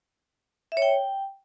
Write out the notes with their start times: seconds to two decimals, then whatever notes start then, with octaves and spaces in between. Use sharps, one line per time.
0.72 E5
0.77 C#5
0.82 G5